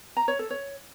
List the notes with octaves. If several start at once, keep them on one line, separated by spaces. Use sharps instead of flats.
A#5
C#5
A4
C#5